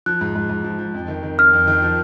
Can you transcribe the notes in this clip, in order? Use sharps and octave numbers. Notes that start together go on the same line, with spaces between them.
F3 F#6
G#2
G#2
G#2
F3
F3
F2
D#3
D#3
F2 F6
F2
D#3
F3